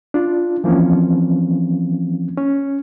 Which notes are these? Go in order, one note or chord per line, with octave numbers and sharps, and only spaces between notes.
D4 F4
E3 F3 A#3 C4 C#4
C#4